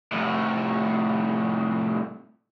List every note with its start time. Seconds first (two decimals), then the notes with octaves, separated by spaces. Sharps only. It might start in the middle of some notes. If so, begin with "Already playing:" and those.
0.12 C2 A2